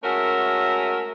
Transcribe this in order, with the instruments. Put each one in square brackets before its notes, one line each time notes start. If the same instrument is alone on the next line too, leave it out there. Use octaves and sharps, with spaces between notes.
[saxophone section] G#3 A3 C#4 F#4 A#4 E5